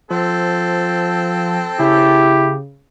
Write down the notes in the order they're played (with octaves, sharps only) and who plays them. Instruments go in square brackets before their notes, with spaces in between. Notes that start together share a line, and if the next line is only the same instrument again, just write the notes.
[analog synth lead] F3 [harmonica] C4 A4
[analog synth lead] C#3 [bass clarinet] E4 [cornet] G4